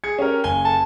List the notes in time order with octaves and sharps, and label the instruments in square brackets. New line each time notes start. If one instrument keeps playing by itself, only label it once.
[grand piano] G#4 G#6 C#7
C#4 G4 A#4
F#1 G#5 G7
[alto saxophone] A5